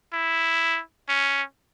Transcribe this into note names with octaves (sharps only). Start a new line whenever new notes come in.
E4
C#4